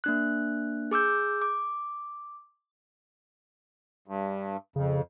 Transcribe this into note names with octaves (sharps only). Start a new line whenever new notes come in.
A#3 D4 F#6
G#4 D6 E6 G6
D6
G2
F2 C#3